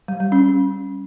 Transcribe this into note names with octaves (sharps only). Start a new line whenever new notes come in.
G3
G3
C#4